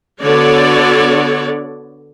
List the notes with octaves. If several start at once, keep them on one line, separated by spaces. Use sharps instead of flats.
D3 B3 F#4 A4 C#5 D5